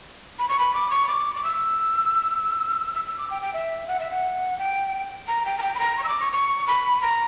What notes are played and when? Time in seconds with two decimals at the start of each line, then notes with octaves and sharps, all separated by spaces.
0.39 B5
0.49 C#6
0.59 B5
0.74 D6
0.90 C#6
1.08 D6
1.35 D6
1.44 E6
2.94 E6
3.07 E6
3.18 D6
3.30 G5
3.42 G5
3.53 E5
3.88 F#5
4.00 E5
4.10 F#5
4.58 G5
5.28 A#5
5.45 G5
5.58 A#5
5.62 G5
5.75 B5
5.80 A#5
5.97 C#6
6.04 E6
6.08 D6
6.20 C#6
6.32 C#6
6.67 B5
7.02 A#5